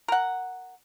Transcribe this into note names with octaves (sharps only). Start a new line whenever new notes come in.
A#4 F#5